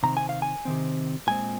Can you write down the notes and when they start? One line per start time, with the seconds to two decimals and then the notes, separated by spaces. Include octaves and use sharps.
0.03 C3 D#3 C4 A#5
0.17 G#5
0.29 F5
0.42 G#5
0.65 C3 D#3 C4
1.27 A#2 G#3 C4 G#5